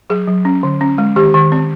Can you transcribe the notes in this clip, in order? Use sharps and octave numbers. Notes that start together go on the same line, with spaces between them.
F#3 G#4
F#3
C#4
D3
C#4
G#3
D#3 G4
D#3
C4